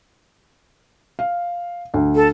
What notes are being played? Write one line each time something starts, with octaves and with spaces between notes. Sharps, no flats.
F5
D2
A4